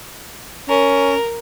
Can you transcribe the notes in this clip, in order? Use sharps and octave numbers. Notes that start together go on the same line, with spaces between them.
C#4 A#4